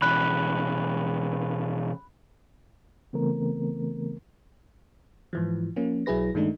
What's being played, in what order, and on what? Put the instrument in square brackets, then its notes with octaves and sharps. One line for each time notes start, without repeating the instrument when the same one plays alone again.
[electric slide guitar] B2 E3 C#4 [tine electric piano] B5 F#6
[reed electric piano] C#3 E3 A3 B3 C4 A#4
[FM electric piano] G#2 E3 F3
F3 A#3 C#4
B1 F#3 E4 G#4 B4 A#6
G2 D#3 G#3 A3 D4 D#4